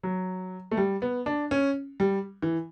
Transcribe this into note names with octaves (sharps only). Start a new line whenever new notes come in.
F#3
A3
G3
B3
D4
C#4
G3
E3